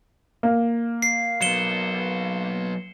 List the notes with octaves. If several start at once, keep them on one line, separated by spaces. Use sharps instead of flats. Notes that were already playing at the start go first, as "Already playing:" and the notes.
A#3
C7
F#3 B3 C#7 E7 G7